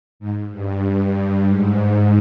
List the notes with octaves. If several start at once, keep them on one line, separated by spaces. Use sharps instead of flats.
G#2
G2
G2
G2
G#2